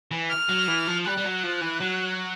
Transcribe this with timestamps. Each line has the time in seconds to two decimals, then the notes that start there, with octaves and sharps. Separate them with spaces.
0.11 E3
0.30 F6
0.49 F#3
0.68 E3
0.87 F3
1.06 G3 F#6
1.17 G3
1.25 F#3
1.43 F3
1.61 E3
1.80 F#3